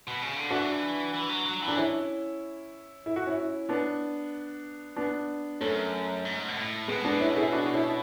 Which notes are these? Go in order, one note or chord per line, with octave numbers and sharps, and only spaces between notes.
B2
C#3
D3
E3 D4 F#4
E3
F#3
F#3
E3
D4
C#4 E4
E4
F#4
C#4 E4
B3 D4
B3 D4
F#2 A3 C#4
G#2
B2
A2
B2 G#3 B3
B3 D4
C#4 E4
E4 G#4
D4 F#4
C#4 E4